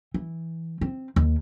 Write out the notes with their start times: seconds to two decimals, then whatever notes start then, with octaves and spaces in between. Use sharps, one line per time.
0.14 E3
0.81 C4
1.16 D#2